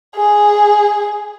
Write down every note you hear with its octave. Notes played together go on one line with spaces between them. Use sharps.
G#4